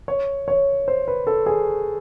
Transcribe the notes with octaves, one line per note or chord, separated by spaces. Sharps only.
C#5
C#5
C5
B4
A4
G#4